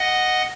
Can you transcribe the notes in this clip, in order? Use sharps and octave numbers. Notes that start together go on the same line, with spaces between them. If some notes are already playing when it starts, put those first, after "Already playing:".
Already playing: D#5 F#5